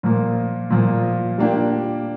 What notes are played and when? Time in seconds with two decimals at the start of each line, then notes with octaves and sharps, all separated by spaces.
0.03 A#2 F3 A#3
0.70 A#2 F3 A#3
1.38 G3 A#3 D4 G4